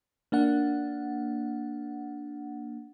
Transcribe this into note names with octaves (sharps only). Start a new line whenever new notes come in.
A#3 D4 F#5